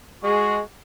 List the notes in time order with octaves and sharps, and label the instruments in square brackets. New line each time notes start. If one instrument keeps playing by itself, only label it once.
[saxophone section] G#3 G#4 [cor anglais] F#4